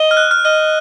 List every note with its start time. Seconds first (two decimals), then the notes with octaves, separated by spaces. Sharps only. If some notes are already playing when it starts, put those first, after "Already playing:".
Already playing: D#5
0.11 F6
0.17 F#6
0.31 F6
0.45 D#5 F6